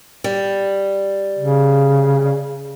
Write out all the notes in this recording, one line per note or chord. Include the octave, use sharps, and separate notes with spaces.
G3
C#3